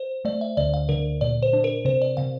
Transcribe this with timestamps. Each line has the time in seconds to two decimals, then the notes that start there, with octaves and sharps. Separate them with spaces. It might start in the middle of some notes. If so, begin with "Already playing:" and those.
Already playing: C5
0.25 A3 D5
0.41 E5
0.57 D2 D5
0.74 F5
0.89 D3 A#4
1.21 A#2 D5
1.43 C5
1.53 D4
1.64 A#4
1.85 C3 C5
2.02 D5
2.17 C3 F5